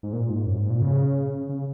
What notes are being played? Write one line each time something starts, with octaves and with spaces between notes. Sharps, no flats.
G#2
A#2
G#2
F#2
G#2
A#2
C#3
C#3